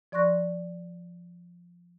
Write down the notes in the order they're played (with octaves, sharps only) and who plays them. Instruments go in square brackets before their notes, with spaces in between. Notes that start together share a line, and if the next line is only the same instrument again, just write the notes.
[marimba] F3 D5 C6 C#6 F#6 A#6